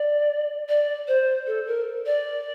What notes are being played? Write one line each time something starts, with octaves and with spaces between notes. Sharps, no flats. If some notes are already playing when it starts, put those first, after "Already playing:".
Already playing: D5
D5
C5
A4
A#4
D5